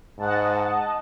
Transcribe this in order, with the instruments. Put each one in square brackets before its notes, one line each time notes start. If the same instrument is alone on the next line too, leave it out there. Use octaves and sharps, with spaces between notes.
[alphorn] G#2 [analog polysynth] D#5 F#5 A5